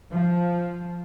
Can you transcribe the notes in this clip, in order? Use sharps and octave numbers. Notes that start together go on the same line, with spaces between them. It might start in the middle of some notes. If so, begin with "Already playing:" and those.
F3